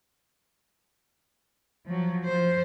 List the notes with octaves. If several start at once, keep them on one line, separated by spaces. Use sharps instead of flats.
F3 F#3
F3 C5